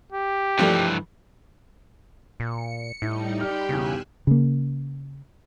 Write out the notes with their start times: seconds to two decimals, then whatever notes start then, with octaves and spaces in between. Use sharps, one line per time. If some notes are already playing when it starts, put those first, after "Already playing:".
0.12 G4
0.59 G2 E3 F3 G3 A3
2.40 A#2 C#7
3.02 A2 G3 D#4 E4
3.41 G4 D5 G5 B5 C6 F6
3.69 B1 E2 C#3 G#5 E6 F#6
4.27 C#3 A#3